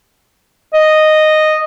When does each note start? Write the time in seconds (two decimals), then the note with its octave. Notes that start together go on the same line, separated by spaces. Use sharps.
0.74 D#5